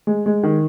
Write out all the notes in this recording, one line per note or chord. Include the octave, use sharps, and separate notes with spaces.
G#3
G#3
D#3